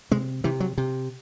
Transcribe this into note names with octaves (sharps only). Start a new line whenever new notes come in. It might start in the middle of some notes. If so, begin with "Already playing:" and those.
C3 G#3
C3 E3
F#3
C3